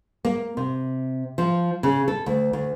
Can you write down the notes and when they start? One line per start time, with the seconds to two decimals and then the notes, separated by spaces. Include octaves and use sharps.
0.25 A#3
0.57 C3
1.38 F3
1.83 C#3
2.08 A4
2.26 D2
2.53 D2